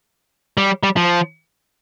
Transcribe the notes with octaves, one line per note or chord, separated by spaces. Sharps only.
G3
G3
F3